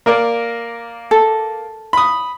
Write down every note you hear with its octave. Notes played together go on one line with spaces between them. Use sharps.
A#3 A#4 D5
A4
B5 D#6